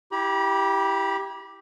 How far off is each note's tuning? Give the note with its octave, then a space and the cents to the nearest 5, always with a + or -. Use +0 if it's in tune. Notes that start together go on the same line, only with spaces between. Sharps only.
E4 +0 G4 +0 B5 -45